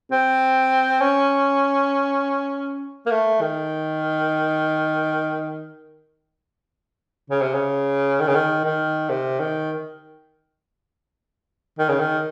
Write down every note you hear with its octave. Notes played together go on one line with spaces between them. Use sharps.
C4
C#4
A#3
A3
D#3
C#3
C3
C#3
D#3
C#3
D#3
D#3
C3
D#3
D#3
C#3
D#3